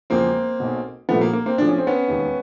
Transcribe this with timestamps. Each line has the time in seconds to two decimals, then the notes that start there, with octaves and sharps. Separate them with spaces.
0.10 E1 E2 C#3 F3 A#3 C4
0.60 B1 B2
1.09 C2 A#2 F3 A3 B3
1.21 A#3
1.33 A#3
1.46 A#3 C4
1.58 B1 A2 F3 D4
1.68 C#4
1.78 C4
1.87 B3 C#4
2.08 E1 D#2 D#3